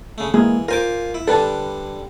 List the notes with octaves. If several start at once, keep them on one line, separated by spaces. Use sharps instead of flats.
C#3 A3
E3 G#3 A#3 G#4
F4 A#4 C5 G#5 D6
E4
D3 G3 D4 A4 B4 A5